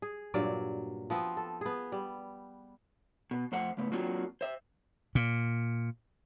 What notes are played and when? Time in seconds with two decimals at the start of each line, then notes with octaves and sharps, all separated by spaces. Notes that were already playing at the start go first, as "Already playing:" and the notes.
0.02 G#4
0.34 G2 A#2 F#3 D5
1.10 F3 B3 C4
1.37 A4
1.61 B3 G#4
1.92 G3
3.31 B2
3.52 F2 A3 C5 E5 F#5
3.77 G#2 C#3 A3 B3
3.92 F#3 A#3 C4 D4 F4 F#4
4.41 C5 E5
5.15 A#2